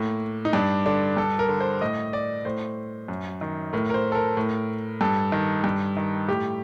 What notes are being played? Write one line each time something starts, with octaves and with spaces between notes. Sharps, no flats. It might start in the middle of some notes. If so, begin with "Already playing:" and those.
Already playing: A2 A#3
D#4
G2 D4
D3 D4
G2 A4
A#4
D3
C5
A2 D#5
D5
A2 C5
F#2
D#3
A2 A#4
A#4
C5
A4
A#4
A2
G2 A4
D#3
G2
D#3
A2 G4